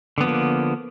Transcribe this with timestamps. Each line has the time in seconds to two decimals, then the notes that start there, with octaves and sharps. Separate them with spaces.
0.18 D3
0.21 B3
0.24 F3
0.26 A#3